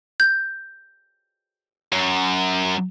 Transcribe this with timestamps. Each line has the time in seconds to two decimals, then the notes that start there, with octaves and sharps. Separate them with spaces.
0.20 G6
1.92 F#2